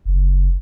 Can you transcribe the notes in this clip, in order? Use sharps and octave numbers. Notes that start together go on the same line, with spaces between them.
F#1